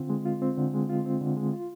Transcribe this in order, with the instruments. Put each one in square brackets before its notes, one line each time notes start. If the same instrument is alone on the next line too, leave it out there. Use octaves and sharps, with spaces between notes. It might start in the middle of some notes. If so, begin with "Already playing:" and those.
Already playing: [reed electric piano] D3 C4 F4
G#3
F4
C4
D3
G#3
F4
C4
D3
G#3
F4